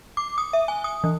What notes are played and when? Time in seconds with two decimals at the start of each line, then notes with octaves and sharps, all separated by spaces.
0.17 D6
0.38 D#6
0.53 E5
0.68 G#5
0.84 D#6
1.04 E3